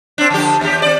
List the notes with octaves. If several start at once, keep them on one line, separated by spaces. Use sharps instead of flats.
C4 D4
D3 F3 G4
D#2 G4
C4 D5